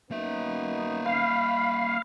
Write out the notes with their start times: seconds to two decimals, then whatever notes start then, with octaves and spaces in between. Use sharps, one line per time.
0.11 F#2 A#3 B3 D#4 E5
1.06 F5 B5